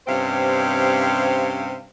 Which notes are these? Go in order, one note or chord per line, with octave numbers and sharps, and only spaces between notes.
G2 C3 C4 C#4 C5 F5